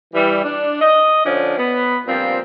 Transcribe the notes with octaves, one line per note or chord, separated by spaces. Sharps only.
E3 G3
D4
D#5
D3 F3 C#4 D4
B3
G2 A#2 F3 C4